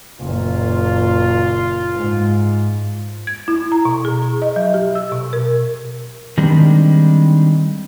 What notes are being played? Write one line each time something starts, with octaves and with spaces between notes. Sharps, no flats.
F#1 A#2 F4
G#2
G#6
E4
A#5
B2
G#4
D#5
F#3
G4
E6
B2
A#4
D#3 G3 G#3 C4 D4